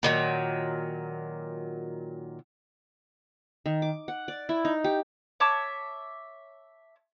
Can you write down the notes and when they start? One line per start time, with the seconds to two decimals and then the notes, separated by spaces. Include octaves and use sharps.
0.03 A#2 D#3 F#3
3.66 D#3
3.82 D6
4.08 F#5
4.28 D5
4.49 E4
4.65 D#4
4.84 G4
5.40 C#5 E5 A5 D6